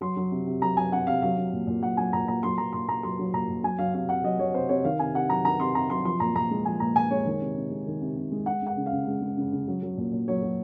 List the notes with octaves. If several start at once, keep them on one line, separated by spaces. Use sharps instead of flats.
F#3 C6
F#3
C3
C3
F#3 A#5
F#3 G#5
C3 F#5
C3 F5
F#3 F5
F#3
A#2
A#2
F#3 F#5
F#3 G#5
A#2 A#5
A#2 A#5
F#3 C6
F#3 A#5
A#2 C6
A#2 A#5
F#3 C6
F#3
A#2 A#5
A#2
F#3 G#5
F#3 F5
C3 F5
C3 F#5
F#3 D#5
F#3 C#5
C3 C5
C3 C#5
D#3 F5
C3 G#5
C3 F#5
F#3 A#5
D#3 A#5
C3 C6
C3 A#5
F#3 C6
F3 C6
A#2 A#5
A#2 A#5
G#3
F3 G#5
A#2 A#5
A#2 G#5
G#3 C#5
D#3
C3
C3
G#3
D#3
C3
C3
G#3
G#3 F#5
G#3 F#5
C#3
F5
C#3
G#3
G#3
C#3
C#3
F#3
F#3
A#2
A#2
F#3 C#5
F#3